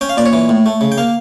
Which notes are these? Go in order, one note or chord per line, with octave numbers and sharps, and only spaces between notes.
C#4 G5
F5
A#2 D5
C#5
E3
A2
A3
C#3
G5
A#3 F5